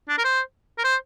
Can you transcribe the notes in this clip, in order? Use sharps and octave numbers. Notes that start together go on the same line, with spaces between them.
D4
A#4
C5
A#4
C5